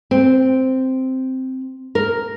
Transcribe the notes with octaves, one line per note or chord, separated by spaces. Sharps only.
C4
A#4